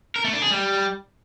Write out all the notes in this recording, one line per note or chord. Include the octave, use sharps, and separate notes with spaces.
A#4
A3
D4
G#4
G3